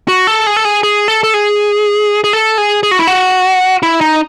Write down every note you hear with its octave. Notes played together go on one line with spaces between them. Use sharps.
F#4
A4
G#4
A4
G#4
G#4
A4
A4
G#4
G#4
A4
G#4
G#4
F#4
E4
F#4
E4
D#4